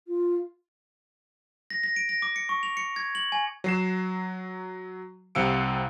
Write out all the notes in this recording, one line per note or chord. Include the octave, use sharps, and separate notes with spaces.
F4
A#6
A#6
D7
A#6
D6
C#7
C#6
F7
C#7
G#6
F#7
G#5
F#3 C7 E7
C2 C3 F5 E6 C#7 D7